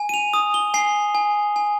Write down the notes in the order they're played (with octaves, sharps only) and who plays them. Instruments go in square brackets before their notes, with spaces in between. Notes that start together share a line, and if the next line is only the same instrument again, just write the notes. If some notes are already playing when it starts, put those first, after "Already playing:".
Already playing: [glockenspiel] G#5
D#7
F7
D#6
G7
G#5 C7
G#5
G#5